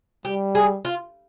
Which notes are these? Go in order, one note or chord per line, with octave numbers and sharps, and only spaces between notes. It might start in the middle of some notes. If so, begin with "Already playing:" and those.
G3 G4
G#4
F4